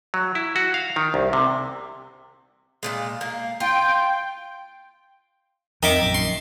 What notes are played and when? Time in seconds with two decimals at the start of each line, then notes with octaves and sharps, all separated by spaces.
0.14 F#3
0.35 E4
0.56 F#4
0.74 F5
0.96 D#3
1.14 C2
1.33 C3
2.83 A#2 E3 G#3
3.21 A#3
3.60 F4 G5
5.83 F2 D#3 D#5 E5 D6
6.02 A#1 F#2
6.14 C6